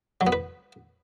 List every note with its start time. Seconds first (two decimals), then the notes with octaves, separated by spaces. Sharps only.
0.21 F#3
0.27 B3
0.32 B4